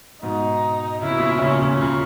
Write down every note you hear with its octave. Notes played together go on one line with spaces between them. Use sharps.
G#2 B2 D#4
C#3 E4
B2
A#2 C#3
A#2 C#3 C#4
A#2 C#3
A#2 C#3